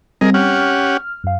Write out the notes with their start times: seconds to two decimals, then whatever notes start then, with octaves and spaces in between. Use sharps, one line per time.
0.21 G3 C4 G#4 A#4 D#5
0.34 C#4 G4 F#5 F6
1.24 F#2 F5